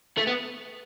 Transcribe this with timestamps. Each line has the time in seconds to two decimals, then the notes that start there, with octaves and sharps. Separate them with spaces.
0.18 A3
0.27 B3